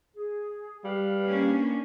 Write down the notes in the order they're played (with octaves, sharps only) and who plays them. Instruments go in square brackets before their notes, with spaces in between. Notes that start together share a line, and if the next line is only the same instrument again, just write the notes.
[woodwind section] G#4
[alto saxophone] G3 [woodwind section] B4 F5
[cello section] A#3 C#4 D4